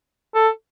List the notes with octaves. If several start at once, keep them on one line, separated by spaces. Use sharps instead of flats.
A4